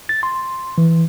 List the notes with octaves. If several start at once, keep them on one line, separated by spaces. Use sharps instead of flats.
A6
C6
E3